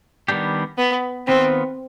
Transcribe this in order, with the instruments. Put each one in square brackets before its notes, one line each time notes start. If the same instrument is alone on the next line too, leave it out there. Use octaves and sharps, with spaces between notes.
[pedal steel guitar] D#3 G3 B3 D4 G4
[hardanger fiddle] B3
[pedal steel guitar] D#3 B3 F4 B4 [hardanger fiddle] C4